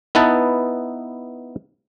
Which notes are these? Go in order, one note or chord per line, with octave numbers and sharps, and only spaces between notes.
B3 D#4 E4 B4 A5